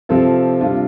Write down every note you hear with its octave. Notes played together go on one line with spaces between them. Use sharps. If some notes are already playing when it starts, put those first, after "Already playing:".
C3 F3 C4 F4 A4
C3 G3 D4 F4